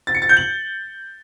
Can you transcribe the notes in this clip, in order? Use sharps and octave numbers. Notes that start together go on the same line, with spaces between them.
A6
C#7
A6
G6
F#7